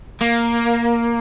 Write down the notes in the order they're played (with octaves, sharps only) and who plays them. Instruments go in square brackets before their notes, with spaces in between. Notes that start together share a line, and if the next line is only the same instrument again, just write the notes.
[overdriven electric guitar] A#3